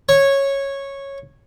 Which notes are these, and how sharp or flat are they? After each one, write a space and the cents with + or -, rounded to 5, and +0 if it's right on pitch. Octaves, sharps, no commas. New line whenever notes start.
C#5 -10